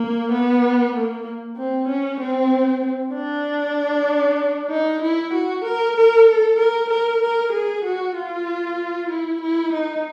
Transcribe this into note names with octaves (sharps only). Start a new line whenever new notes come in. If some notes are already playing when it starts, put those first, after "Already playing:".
Already playing: A#3
B3
A#3
C4
C#4
C4
D4
D#4
E4
F#4
A#4
A#4
A4
A#4
A#4
A#4
G#4
F#4
F4
E4
E4
D#4